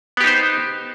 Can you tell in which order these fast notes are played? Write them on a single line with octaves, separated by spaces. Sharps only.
B3 G4 D#4 C5